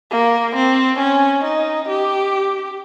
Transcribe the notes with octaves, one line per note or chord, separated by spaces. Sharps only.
A#3
C4
C#4
D#4
G4